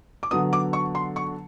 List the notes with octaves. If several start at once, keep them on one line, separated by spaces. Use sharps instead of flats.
D6
D3 F#3 B3 D#6
D6
C#6
C6
C#6